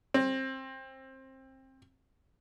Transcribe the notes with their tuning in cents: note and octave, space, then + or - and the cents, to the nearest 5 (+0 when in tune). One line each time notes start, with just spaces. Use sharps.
C4 +20